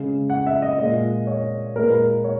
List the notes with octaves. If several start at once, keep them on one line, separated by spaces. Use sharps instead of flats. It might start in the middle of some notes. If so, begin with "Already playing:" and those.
Already playing: C#3 G#3
F#5
E5
D#5
A#2 G#3 D#5
C#5
A#2 G#3 A#4
B4
A#4
C#5